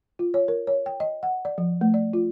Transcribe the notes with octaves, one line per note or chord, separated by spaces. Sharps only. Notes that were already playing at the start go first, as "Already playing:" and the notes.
F4
C#5
A#4
C#5
G5
D#5
F#5
D5
F3
A3
D5
F4